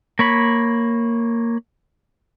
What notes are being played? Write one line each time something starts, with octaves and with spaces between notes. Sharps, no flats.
A#3 C#5 B5